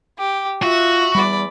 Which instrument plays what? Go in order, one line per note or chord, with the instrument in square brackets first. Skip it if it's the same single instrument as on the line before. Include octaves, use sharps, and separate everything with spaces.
[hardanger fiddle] G4
[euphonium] F4 [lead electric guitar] F#4 [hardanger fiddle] E5
[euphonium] E2 [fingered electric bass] G3 [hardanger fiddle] D5 B5